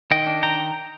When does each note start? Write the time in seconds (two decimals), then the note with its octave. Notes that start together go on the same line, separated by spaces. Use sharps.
0.11 D#3 D#5 G5
0.27 D4
0.43 D#3 G5 A#5